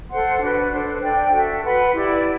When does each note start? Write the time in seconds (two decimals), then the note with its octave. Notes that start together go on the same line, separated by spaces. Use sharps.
0.10 A4 C5 F#5 C6
0.40 D4 F#4 B4
0.71 D4 A4 C5
1.01 D4 A4 D5 G5
1.32 F#4 A4 E5
1.63 B4 F#5 C6
1.93 E4 G4 D5